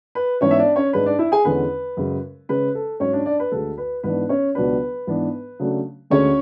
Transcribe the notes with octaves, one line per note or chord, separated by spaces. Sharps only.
B4
G#2 E3 B3 C#4 D4 C#5
E5
D4 D5
C#4 C#5
G#2 G#3 D4 B4
D4 D5
E4 E5
G#4 G#5
E2 D3 G#3 C#4 B4
F#2 C#3 G#3
C#3 G#3 C#4 B4
A4
G#2 F#3 C#4 C#5
D4 D5
D4 D5
B4
D2 D3 G#3 A4
B4
G#2 E3 B3 D4 B4
C#4 C#5
C#2 B2 F#3 B3 D4 B4
G#2 E3 B3 D4
C#3 F#3 A3 D4
D2 D3 G#3 C#4 C#5